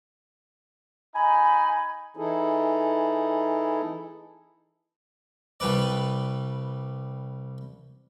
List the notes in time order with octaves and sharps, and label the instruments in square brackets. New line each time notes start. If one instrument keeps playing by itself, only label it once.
[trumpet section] D#4 G#5 [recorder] B5
[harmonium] E3 D#4 E4 G#4 A4
[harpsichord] C2 G3 B4 D5